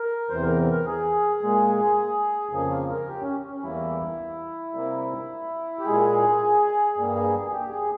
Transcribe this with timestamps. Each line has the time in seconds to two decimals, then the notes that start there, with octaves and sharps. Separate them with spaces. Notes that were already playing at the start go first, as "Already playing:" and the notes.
Already playing: A#4
0.30 E2 C3 E3 C5
0.43 A#4
0.71 A#4
0.86 G#4
1.41 A#2 G#3
2.52 F2 C#3 F3 A#3 G#4
2.70 F4
2.90 A#4
3.08 G4
3.21 C#4
3.49 C#4
3.63 E2 E3 G3 A#3 E4
4.74 C3 G3 A#3
5.79 G4
5.85 A#2 G#3 G#4
6.96 G2 G3 A#3
7.15 G#4
7.46 G#4
7.52 G4
7.71 G#4